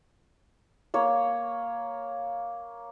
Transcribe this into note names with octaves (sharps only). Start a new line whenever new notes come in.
A#3 C#5